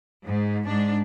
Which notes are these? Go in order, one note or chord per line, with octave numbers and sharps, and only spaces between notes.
G#2
G#2 G#3 D4